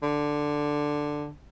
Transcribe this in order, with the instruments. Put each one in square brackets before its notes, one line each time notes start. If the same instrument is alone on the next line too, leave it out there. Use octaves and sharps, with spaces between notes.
[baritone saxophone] D3